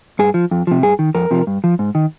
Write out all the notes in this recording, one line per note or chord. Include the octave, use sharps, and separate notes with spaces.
G2 G#4
F3
F2
C3 F3
G2 G#4
D#3
F2 A#4
C3 F3
G2
F3
G#2
D#3